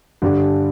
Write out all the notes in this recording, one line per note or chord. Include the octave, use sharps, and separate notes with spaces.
G2 D3 G3 D4 G4